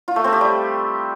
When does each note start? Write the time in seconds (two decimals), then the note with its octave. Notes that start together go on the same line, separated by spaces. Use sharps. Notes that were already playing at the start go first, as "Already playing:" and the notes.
0.08 F4
0.16 A3
0.24 C4
0.33 G4
0.41 G3